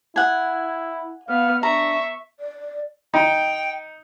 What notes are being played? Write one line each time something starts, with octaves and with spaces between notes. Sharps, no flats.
E4 F#5 G#5
B3 F5 F6
D4 E5 A#5 C#6
D5
D#4 G5